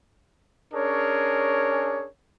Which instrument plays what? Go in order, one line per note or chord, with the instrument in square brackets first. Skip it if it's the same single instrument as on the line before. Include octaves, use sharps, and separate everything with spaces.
[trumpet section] C#4 D4 G#4 A#4 C#5